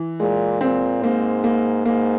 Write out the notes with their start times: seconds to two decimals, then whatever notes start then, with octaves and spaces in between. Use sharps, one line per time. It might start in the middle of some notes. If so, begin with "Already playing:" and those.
Already playing: E3
0.20 A#2 G#3
0.61 A#2 C4
1.03 G#2 A#3
1.44 A#3
1.85 G#2 A#3